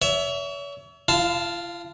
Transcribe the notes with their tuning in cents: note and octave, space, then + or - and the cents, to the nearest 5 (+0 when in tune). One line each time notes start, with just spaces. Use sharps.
C#5 +40 E5 +0
F4 -45 F5 +0 A5 +0